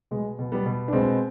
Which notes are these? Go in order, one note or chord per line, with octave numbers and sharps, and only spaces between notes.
B2 G#3
B2
G3 B3
B2
D4
B2 G#3 C4